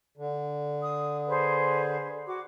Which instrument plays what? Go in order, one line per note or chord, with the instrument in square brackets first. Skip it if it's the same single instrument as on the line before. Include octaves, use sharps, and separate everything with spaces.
[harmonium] D3
[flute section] D#6
G#4 B4 C5
F#4 D6